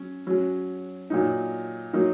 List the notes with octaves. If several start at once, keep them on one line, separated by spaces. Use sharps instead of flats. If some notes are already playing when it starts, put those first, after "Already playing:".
Already playing: F#3 C#4
F#3 C#4
A#2 F#3 D#4
F#3 A#3 D#4